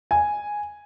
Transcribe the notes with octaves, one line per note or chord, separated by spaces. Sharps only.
G#5